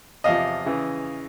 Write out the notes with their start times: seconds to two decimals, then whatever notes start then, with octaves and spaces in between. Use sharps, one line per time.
0.24 E2 C3 F3 D#5 F5
0.66 C#3 E3